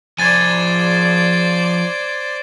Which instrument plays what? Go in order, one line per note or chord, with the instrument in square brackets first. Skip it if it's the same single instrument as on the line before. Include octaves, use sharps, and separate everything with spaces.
[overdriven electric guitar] F3 G#4 [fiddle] C5 D5 [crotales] G#6 A6 D#7